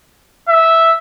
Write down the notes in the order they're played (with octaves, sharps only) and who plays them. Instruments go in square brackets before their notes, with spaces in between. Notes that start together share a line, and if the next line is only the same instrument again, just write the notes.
[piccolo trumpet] E5